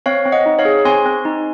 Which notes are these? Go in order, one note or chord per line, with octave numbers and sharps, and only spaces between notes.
C4 C#5 F5
C4
D#5 F#5
D#4
C#5 F5
G#4
C4 G#5 C6
C4
D#4